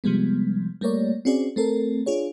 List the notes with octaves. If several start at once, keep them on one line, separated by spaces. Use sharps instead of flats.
C3 F3 G3 G#3 B3
G3 A3 A#3 A#4 C#5 D5
C4 C#4 F#4 G#4 D5
A3 C4 A4 A#4
D4 F4 G#4 C#5